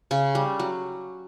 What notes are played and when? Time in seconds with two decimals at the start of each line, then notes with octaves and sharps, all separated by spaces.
0.11 C#3 C#4
0.35 G3
0.59 F#3